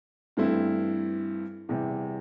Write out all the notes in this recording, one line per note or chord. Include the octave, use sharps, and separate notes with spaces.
G2 E3 A3 C4 E4
E2 C3 G3